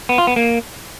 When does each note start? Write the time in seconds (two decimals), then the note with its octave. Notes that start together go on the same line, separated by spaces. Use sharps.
0.09 B3
0.18 F4
0.27 B3
0.36 A#3